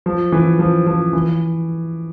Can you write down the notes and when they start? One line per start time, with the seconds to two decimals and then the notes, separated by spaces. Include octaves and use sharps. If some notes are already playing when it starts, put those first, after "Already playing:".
0.06 F3
0.32 E3
0.59 F3
0.86 F3
1.13 E3